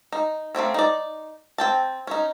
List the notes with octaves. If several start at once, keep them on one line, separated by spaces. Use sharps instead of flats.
D#4
A3 A#3 C4 C#4
D#4 D5
C4 G5 A5
C#4 D#4